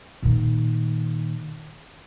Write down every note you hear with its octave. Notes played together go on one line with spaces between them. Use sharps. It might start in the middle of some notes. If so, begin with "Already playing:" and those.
A#2 D#3